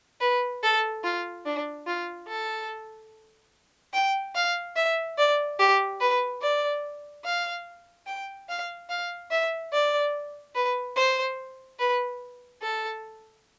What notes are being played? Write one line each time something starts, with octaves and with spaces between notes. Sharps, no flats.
B4
A4
F4
D4
F4
A4
G5
F5
E5
D5
G4
B4
D5
F5
G5
F5
F5
E5
D5
B4
C5
B4
A4